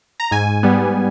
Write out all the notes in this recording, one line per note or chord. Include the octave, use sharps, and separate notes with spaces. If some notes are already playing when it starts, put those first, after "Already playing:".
A#5
G#2 G#5
G3 B3